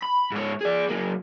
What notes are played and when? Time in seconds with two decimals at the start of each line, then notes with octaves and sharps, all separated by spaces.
0.02 B5
0.31 G#2 C#5
0.61 G#4 D5
0.89 F#3 A#3